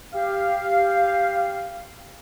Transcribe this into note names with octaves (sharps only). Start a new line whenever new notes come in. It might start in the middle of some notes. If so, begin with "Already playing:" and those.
G4 F5